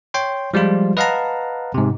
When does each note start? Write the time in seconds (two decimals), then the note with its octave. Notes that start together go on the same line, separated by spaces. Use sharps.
0.14 C#5 G5 C6
0.54 F3 G3 G#3 F4
0.97 B4 D#5 F5 F#5 A5 A#5
1.74 G#2 C3